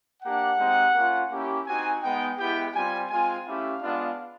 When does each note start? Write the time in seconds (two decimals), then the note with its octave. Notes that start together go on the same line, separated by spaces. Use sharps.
0.23 A#3 D4 G4 F#5
0.59 G#3 C4 D#4 G4
0.94 A#3 C#4 F4
1.30 A#3 C#4 E4 G4
1.66 C4 D#4 F#4 G#5
2.02 G#3 B3 D#4 G5
2.38 G#3 B3 E4 G4 G5
2.74 G3 C4 F4 G#5
3.10 G#3 C4 F4 G#5
3.46 A3 C#4 E4 G4 F5
3.81 G#3 B3 D4 F4